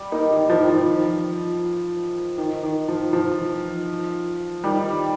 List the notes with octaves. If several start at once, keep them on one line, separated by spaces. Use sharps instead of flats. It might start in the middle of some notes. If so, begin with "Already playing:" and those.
Already playing: G3
A#3 D#4
D#3
F3
D#3
F3
D#3
D#3
F3
F3
D#3 G3